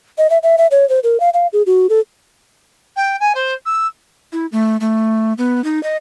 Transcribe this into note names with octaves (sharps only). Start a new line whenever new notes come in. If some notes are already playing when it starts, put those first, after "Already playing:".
D#5
E5
E5
E5
C#5
C5
A#4
F5
F5
G#4
F#4
A4
G5
G#5
C5
E6
E4
A3
A3
B3
D#4
D#5